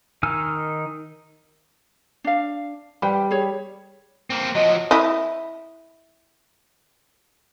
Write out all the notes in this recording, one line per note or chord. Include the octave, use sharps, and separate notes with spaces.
D#3 D#4 G#5 E6 F6
D4 F5
G3 B4 C5 G5
G#4 C#5
A#3 C4
F3 F#3 D#5
E4 D#5